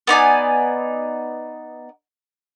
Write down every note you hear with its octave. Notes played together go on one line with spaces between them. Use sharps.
B3 D#4 D5 G#5